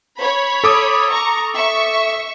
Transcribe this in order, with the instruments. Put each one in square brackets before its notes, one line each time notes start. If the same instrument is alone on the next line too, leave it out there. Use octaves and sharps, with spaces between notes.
[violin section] C#5 B5
[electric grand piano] A4 D6 D#6
[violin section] A#5 C#6
E5 C#6